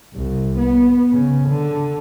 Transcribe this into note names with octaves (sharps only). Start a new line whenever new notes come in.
C2
B3
C#3
D3